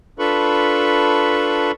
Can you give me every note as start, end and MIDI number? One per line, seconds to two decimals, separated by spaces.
0.19 1.72 62
0.19 1.72 65
0.19 1.72 69
0.19 1.72 71
0.19 1.72 83
0.19 1.72 85